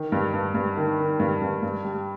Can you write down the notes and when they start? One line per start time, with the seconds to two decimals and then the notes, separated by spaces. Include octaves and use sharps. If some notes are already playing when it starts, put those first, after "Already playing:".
Already playing: D#3
0.12 G2
0.34 G2
0.55 G2
0.77 D#3
0.99 D#3
1.20 G2
1.41 G2
1.63 G2
1.85 G3